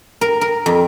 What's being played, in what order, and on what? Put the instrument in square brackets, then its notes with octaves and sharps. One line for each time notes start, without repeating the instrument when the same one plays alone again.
[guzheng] A#4
A#4
F2